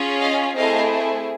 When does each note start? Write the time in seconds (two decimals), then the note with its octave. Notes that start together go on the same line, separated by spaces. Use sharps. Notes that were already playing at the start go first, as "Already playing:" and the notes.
Already playing: C#4 F4 G#4
0.21 D#5 F5
0.56 A3 C4 E4 G#4 D#5 F5